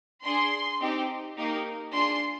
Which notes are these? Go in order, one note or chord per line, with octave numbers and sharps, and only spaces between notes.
D4 G#4 C6
C4 D#4 G4
A#3 D#4 G4
D4 F4 G#4 C6